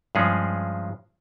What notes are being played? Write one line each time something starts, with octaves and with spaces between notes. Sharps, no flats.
G2 F3 G#3 C#4 G#4